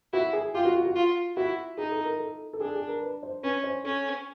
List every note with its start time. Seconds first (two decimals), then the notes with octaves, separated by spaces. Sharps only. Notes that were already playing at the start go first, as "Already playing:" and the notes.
0.13 E4 F#4
0.33 G#4
0.54 F4 G4
0.65 F#4
0.75 F#4
0.86 F#4
0.95 F4
1.37 E4 F#4
1.77 D#4 G#4
1.92 A4
2.05 A#4
2.20 A4
2.53 A4
2.60 D4 G#4
2.75 G#4
2.88 A#4
3.02 B4
3.23 C5
3.43 C#4 B4
3.64 C5
3.84 C#4 A4